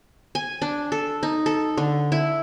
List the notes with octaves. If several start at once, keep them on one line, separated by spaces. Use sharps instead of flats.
G#5
D4
A4
D#4
A4
D3
E4